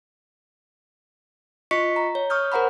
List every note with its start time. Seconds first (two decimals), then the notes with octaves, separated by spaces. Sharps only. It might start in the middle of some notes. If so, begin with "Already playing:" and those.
1.71 F4 D#5 C#6 B6 C#7
1.96 A#5
2.15 C#5
2.30 C#6 D#6 F6 G6
2.52 A#4 C5 F#5 A#5 B5